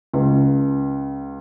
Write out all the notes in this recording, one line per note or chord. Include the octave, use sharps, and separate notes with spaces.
C#2